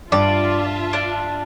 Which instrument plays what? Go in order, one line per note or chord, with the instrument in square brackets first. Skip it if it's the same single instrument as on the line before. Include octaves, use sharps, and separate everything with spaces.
[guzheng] G2 [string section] F4 E5 A5 [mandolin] D5
[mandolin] D4